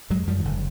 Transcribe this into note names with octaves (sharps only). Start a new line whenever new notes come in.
F#2 F#3 G#3
F#2 F3 G3
D#3
F#1 D3